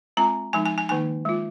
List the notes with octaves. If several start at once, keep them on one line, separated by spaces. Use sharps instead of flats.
G#3 C4 F4 A#5
F3 G#3 D#4 G#5
G#5
G#5
D#3 A#3 D#4 G#5
G#3 F4